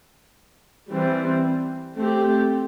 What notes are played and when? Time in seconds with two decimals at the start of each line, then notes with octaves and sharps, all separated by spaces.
0.91 E3 G3 C4
1.96 A3 C4 G4